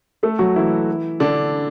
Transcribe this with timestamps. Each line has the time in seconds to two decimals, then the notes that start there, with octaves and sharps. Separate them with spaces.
0.23 A3 A4
0.39 F#3 F#4
0.56 E3 E4
1.20 D3 D4